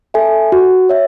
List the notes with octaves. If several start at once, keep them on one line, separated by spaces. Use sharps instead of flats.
A4 E5 G#5
F#4
C#5 E5